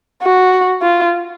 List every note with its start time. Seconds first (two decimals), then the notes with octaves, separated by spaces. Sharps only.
0.22 F#4
0.82 F4